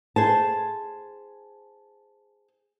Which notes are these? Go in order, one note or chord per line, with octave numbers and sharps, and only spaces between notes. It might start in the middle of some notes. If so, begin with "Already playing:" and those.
G#4 C5 A5